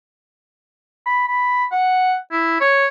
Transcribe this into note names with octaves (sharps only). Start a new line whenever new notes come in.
B5
B5
F#5
E4
C#5